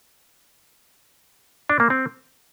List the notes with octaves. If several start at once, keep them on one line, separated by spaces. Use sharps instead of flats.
D4
A#3
C4